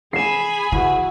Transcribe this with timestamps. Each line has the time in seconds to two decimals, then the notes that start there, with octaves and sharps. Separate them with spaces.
0.13 G#4 G#5 B5 C7 E7
0.72 E3 E4 F#4